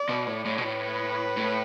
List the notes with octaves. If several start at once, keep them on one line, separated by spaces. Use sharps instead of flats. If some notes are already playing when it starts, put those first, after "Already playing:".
Already playing: D5
B2
A2
A2
B2
A2 B4
A2